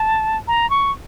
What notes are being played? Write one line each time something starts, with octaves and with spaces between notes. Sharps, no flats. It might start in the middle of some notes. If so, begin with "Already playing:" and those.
Already playing: A5
A#5
C#6